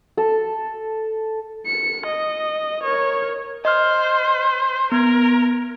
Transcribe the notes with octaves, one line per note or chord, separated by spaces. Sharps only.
A4
C#7
D#5
A#4 C#5
C5 D#5 F6
B3 A#4 G#6